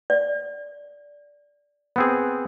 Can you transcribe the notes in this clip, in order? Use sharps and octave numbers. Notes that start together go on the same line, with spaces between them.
D5
B3 C4 G#4